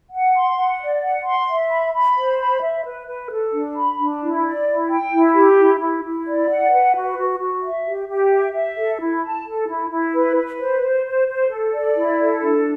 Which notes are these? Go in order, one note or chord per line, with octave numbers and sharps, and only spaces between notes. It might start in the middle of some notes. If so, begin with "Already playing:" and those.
F#5
C6
F#5
D5
F#5
C6
E5
B5
B5
C5
B5
E5
B4
B4
A4
D4
B5
D4
E4
D5
E4
G5
E4
G4
E4
E4
E4
D5
F#5
B4
F#4
F#4
F#4
E5
G4
G4
E5
E5
A4
E4
A5
A4
E4
E4
B4
B4
C5
C5
C5
C5
A4
D5
E4
A4
D4